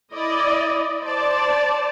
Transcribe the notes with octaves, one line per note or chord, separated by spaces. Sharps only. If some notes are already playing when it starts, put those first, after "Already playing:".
E4 D5 D#5
C5 D5 A5